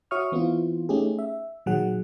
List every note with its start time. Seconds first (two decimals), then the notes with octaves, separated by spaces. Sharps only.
0.11 F#4 C#5 E5 C#6 D#6 F6
0.32 E3 B3 C4 E4 F4
0.89 A3 C#4 D#4 G4 G#4
1.19 E5
1.66 A#2 D#3 F#3 G#4 F#5